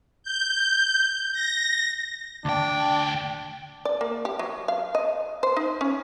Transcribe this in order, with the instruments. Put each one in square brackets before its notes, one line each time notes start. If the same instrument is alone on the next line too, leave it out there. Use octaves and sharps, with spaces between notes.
[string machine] G6
A#6
[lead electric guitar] D2 G5 [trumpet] D4
[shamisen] D5
A#3
G4
F#3
F5
D#5
C5
D#4
C#4